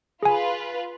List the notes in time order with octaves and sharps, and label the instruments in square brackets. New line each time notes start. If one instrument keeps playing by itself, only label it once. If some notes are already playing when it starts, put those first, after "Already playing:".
[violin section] F4 B4 [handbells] G#4 G#5